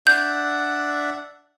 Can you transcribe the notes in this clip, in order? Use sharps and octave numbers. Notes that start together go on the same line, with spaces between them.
D4 E5 F#5 G6